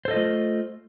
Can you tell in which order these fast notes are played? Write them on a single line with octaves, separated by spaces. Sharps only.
C5 A4 D#5 F4 A3